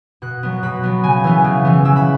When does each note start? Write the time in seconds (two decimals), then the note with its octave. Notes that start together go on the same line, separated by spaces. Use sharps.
0.22 B2 F#6
0.43 F#3 B3
0.63 B2 B5
0.83 F#3 B3
1.04 C#3 G#5
1.24 E3 B3
1.44 C#3
1.65 E3 B3
1.85 C#3 E6
1.96 B5